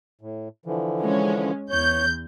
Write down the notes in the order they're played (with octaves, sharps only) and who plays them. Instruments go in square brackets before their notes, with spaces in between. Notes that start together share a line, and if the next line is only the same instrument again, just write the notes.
[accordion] A2
D3 E3 F3
[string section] G#3 C#4
[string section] E2 G6 [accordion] C#5